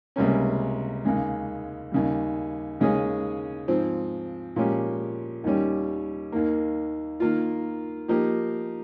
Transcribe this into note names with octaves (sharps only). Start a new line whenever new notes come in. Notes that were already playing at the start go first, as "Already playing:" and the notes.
C#2 C3 G3 A#3 C#4
D#2 C#3 G#3
D#2 C#3 G3
D#2 C#3 G#3 C#4 G#4
G#2 F3 C4
A#2 F3 G#3 C#4 G4
D#2 D#3 G3 C#4 G4
D#2 D#3 A#3
D#3 A#3 F4
F3 A#3 D#4 G4